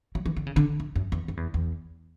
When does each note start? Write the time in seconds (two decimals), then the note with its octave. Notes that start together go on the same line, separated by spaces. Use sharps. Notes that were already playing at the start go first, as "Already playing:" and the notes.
0.15 F#3
0.26 E3
0.37 D3
0.47 C#3
0.56 D3
0.80 C#3
0.96 F#2
1.12 E2
1.28 F#2
1.37 E2
1.54 E2